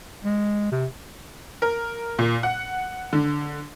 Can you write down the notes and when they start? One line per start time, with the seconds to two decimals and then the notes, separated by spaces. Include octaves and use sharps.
0.24 G#3
0.72 C3
1.62 A#4
2.19 A#2
2.43 F#5
3.13 D3